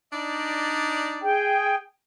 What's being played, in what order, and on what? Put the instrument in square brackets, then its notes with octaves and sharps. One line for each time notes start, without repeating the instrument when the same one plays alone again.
[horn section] D4 D#4 D5
[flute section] G#4 G5